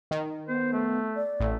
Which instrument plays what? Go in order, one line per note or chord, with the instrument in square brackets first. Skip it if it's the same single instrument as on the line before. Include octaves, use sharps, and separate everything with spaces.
[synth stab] D#3
[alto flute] B3 [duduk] C5
[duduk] A3
[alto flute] D5
[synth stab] A1 [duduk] A3